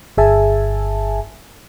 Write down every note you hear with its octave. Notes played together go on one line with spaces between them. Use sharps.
G1 G#4 E5 G#5 A5